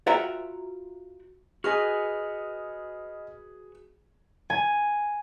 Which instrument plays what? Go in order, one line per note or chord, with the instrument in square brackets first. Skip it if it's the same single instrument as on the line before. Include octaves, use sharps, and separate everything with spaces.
[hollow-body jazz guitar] F4 F#4 B4 E5 G5 A#5
[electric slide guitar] F#4 B4 G#5 [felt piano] G#4 [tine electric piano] D#5 B5 F6
[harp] G#5